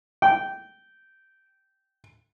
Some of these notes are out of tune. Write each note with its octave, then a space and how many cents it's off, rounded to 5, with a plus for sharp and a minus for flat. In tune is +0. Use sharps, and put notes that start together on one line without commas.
G5 -15